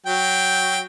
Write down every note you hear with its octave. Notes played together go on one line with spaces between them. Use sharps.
F#3 G5